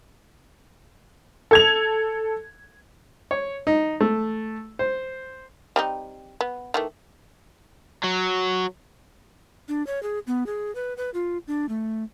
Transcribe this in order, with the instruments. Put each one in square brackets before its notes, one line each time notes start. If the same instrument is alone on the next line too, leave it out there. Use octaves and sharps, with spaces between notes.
[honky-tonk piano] A4 G#6 F7
[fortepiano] C#5
D#4
A3
C5
[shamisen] G3 C4 D#4
B3
D#3 E3 A3
[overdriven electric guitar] F#3
[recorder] D4
C#5
G#4
B3
G#4
B4
B4
F4
D4
A3